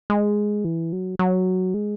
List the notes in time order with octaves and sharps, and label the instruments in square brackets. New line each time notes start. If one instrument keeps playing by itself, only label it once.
[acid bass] G#3
E3
F#3
F#3
G#3